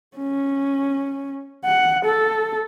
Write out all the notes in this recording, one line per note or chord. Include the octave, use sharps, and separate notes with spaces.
C#4
F#5
A4